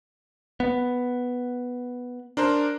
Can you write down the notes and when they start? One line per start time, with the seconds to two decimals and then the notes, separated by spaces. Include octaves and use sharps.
0.60 B3
2.37 D4 A#4 C5